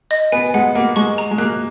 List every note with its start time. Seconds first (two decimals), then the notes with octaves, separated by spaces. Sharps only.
0.11 D#5
0.32 B3 G#5
0.54 G#3 F#5
0.75 A#3 F#5
0.96 G#3 C#6
1.18 A#5
1.31 G#3
1.38 A#3 F#6